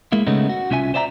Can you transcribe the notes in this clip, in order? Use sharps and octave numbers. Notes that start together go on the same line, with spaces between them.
G#3 A#3 E4
C#3 G#3 A3 B3 C#4 D#4
F#4
C2 C#4 F4 E5 G#5
C5 D5 E5 G#5 A#5